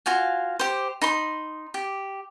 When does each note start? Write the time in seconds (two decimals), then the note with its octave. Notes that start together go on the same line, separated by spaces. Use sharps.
0.06 F4 F#4 F5 G#5
0.59 G4 C5
1.01 D#4 B5 C6
1.74 G4